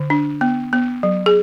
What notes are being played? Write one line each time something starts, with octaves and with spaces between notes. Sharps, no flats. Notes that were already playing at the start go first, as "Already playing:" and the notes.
Already playing: D3
D4
B3
B3
F#3
G#4